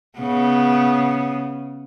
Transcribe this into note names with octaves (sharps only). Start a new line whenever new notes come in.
C#3 B3